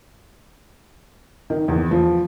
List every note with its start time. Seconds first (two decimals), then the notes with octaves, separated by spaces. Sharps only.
1.50 D#3
1.68 E2
1.91 F3